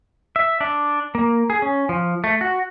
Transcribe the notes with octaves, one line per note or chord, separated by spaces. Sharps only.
E5
D4
A#3
G#4
C#4
F3
A3
F#4